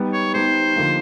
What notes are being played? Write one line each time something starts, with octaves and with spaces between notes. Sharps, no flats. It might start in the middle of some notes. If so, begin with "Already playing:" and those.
Already playing: G3 B3 D#4 G4
C#5
G3 B3 D#4 G4 C5
D3 F3 A#3 D#4